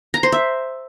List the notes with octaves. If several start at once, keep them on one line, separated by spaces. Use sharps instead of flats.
A#5
C5
E5